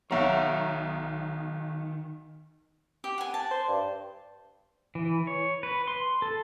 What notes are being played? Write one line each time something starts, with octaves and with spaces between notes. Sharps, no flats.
B1 D#3 C#5 E5 F#5 A#5
G4
F#5 G#5
A5
C5
G2
E3
C#5
B4
C6
A4